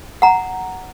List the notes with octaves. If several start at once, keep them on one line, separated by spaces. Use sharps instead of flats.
F#5 A#5